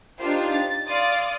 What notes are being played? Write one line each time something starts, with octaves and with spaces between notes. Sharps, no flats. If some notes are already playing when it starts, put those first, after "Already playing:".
D4 D#4 F4 G4 C5
A6
D5 F5 C6 D#6 A6